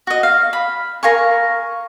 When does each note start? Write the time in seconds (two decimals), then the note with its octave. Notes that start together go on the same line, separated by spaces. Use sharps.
0.07 F#4 D#5
0.23 F5
0.53 B5
1.03 A#4 F5 G#5 C#6